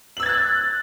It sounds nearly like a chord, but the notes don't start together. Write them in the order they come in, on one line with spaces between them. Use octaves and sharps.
F#7 E6 G#6 A6 F#6